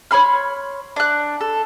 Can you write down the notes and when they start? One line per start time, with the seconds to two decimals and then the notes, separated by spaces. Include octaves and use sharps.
0.11 C#5 B5 C6 F6
0.96 D4 F#6
1.41 A4